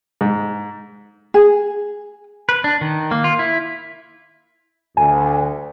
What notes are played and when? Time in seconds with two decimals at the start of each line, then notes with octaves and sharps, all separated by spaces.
0.21 G#2
1.34 G#4
2.49 B4
2.64 D4
2.81 D#3
3.11 A#3
3.24 F4
3.39 E4
4.97 D2 G#5